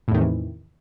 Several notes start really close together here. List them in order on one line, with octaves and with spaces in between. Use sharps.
A2 E2 D#3 C3 E3